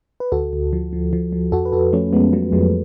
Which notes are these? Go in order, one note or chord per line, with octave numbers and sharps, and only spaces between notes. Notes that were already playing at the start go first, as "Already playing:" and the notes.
B4
D2 F#4 A4
D2
F3
F3
F3
F3
F2 F#4 A4
B4
F2 F#4 A4
F3 A3 C#4
F3 G#3 B3
F3 F#3 A3
F2 F3 G#3